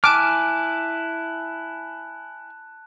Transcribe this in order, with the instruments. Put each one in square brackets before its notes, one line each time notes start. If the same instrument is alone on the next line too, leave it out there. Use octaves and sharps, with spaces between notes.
[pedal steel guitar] E4 G#5 F6 [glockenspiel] A5 F#6 E7 [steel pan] D6